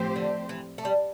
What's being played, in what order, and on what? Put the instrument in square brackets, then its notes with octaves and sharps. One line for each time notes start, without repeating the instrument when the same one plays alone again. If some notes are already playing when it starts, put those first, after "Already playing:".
Already playing: [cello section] A2 F3 C4 G4 C5
[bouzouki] D3
E3
A3
G3